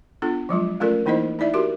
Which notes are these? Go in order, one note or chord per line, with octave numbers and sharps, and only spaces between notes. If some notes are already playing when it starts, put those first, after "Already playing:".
B3 D4 F4 A4
F3 F#3 G#3 F4
A3 C#4 F4 A4 A#4 D5
E3 A#3 D#4 E4 C5 D#5
D#4 E4 D5 E5
F#4 G4 A#4 C6